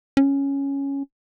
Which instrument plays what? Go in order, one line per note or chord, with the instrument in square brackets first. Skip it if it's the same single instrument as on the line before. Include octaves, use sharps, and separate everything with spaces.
[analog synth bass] C#4